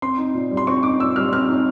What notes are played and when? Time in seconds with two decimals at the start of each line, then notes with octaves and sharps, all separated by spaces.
0.02 C4 C6
0.18 D#4
0.34 A#2
0.51 G3
0.57 C6
0.67 C4 C#6
0.83 D#4 D6
1.00 A#2 E6
1.16 G3 F6
1.33 C4 F6
1.49 D#4